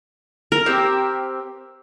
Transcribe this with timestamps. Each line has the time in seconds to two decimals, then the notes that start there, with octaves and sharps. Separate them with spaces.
0.52 A#4
0.66 C4 G4